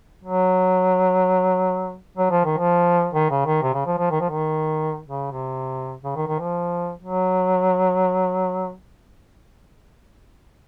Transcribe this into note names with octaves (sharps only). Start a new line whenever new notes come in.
F#3
F#3
F3
D#3
F3
D#3
C#3
D#3
C3
C#3
F3
F3
D#3
F3
D#3
C#3
C3
C#3
D#3
D#3
F3
F#3